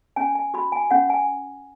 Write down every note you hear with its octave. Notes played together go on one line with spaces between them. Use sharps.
C#4 G#5
G#5
F#4 B5
G#5
C#4 F#5
G#5